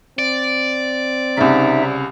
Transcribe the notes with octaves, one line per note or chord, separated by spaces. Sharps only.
C4 D5
C2 C#3 D#4 E5